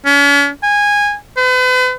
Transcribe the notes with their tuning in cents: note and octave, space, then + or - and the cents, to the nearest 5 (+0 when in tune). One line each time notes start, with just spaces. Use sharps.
C#4 +40
G#5 -15
B4 +40